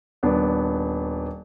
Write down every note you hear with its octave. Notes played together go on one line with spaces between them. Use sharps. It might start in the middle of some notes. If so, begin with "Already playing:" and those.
D#1 B3 D4